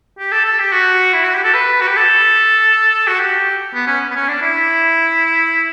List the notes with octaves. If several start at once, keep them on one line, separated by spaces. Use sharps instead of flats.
G4
A4
A4
G4
F#4
E4
F#4
G4
A4
B4
F#4
G4
A4
F#4
G4
B3
C#4
B3
C#4
D4
E4